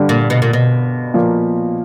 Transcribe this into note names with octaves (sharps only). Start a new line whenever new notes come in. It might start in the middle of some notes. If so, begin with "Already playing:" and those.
Already playing: G2 D3 G3
A#2
B2
A#2
B2
A#2 F3 A#3